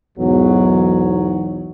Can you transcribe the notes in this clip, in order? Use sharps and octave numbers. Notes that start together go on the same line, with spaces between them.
B1 E2 G#2 F#3